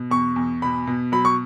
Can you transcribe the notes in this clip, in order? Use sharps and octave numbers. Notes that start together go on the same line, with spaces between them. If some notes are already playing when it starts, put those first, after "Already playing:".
Already playing: B2
E2 C#6
E2
B2 B5
B2
F#3 B5
C#6